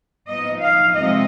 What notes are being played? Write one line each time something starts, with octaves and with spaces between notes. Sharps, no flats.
F3 B3 D#4 D#5
F5
C3 F3 G#3 C4 D#5